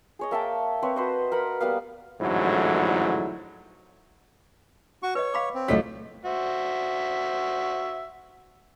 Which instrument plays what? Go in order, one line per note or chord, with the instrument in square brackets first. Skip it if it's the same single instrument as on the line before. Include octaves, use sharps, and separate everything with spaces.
[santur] G#4 C#5 D#5
A#3 E5 G5 A5
C4 B4 C#5
F#4 B4 C5 D#5
A#4 B4 F#5 B5
G3 A#3 B3 F5
[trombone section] A1 F2 G#2 D3 F#3 E4
[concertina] F#4 C#6
[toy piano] B4 D#5 [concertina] C#5
[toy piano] F5 B5 D6
[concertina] C4
[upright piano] C#2 F#3 B6 [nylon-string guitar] G3 A3 E4 [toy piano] C#5 F5
[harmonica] F#4 C5 E5